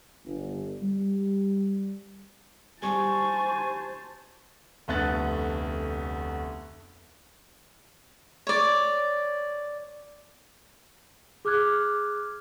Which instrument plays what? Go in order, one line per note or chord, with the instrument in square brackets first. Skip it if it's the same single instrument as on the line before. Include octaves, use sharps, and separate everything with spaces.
[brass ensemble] G1
G3
[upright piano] G3 [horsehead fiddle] C5 A5 [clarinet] G#5 [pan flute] C#6
[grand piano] F1 D2 A3 B3 F#6 A6
[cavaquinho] C#5 D5
[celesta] G#4 D6 F6 F#6 G#6